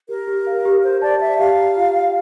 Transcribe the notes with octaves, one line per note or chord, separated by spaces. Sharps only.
G4 A#4
G4
F5
G4
G4 C5
D5 A5
D5 E5
G4 F5
A#5
F4
G5